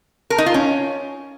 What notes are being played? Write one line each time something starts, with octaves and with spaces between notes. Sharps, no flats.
A#4
D#4
F4
C#4